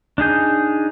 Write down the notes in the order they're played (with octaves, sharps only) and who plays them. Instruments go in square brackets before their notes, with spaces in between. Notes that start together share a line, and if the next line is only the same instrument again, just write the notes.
[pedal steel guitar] D4 D#4 G#4 G6